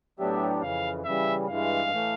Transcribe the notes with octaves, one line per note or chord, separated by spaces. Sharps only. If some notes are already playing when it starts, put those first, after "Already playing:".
A2 F#3 B3 D4 G4 E5
F2 C#3 E3 F5
C#3 E3 G3 E5
G2 E3 G#3 F5
A2 E3 A3